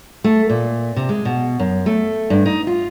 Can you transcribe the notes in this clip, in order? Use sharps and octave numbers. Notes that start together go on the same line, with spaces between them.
A3
A#2
C3
G#3
B2
F#2
A3
G2
D#4
F4